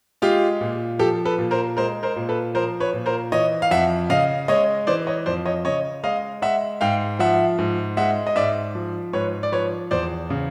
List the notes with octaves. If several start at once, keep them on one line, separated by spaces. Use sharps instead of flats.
G#3 F4 G4
A#2
F3 G4 A4
A4 B4
A#2
A#4 C5
G#3 A#4 C5
A#4 C5
A#2
A4 B4
F3 A#4 C5
B4 C#5
A#2
A#4 C5
E3 C#5 D#5
F5
F2 E5 F#5
C#3 D#5 F5
G#3 C#5 D#5
E3 C5 D5
C#5 D#5
F2 C5 D5
C#5 D#5
C#3 C#5 D#5
G#3 D#5 F5
G#3 E5 F#5
G#2 F5 G5
F3 E5 F#5
G#2
G#3 E5 F#5
D#5
G#2 D5 E5
F3
G#2 B4 C#5
D5
F3 B4 C#5
E2 C5 D5
C#3